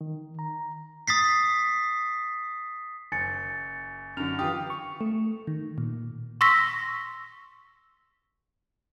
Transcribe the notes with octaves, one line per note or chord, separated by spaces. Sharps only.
D#3
A#5
D#6 A6 B6 C7
F#1 G#5 A6 C#7
F#2 D3 F6 F7
E3 F4 G4 D#6
C#6
A3
D#3
A#2
C6 C#6 E6 A#6 B6